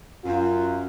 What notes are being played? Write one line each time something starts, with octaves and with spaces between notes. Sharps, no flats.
F#2 F4